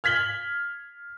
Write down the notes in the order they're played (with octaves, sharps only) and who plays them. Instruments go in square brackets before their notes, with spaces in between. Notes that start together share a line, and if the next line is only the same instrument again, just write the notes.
[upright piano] F6 G#6 B6 F#7 G7